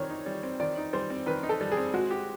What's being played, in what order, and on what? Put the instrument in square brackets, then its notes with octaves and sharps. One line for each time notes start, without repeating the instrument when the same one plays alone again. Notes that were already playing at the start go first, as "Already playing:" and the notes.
Already playing: [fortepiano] D#3 G3 C4 [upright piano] C#5
[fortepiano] D#4
G3
C4
[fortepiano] D#3 [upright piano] D5
[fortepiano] D#4
[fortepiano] G3 [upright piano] C5
[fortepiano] C4
[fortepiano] D#3 [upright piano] B4
[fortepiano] D#4
[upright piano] A4
[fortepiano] G3
[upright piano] G#4
[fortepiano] C4
[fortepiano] G#3 [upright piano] F#4
[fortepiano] G4